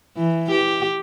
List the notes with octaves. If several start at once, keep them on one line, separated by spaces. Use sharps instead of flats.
E3
G4